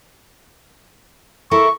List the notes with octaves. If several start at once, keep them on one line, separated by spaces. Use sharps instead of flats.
E4 A4 A#4 C#6